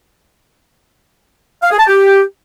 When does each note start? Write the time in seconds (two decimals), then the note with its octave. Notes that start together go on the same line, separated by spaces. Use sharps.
1.63 F5
1.71 G#4
1.79 A5
1.87 G4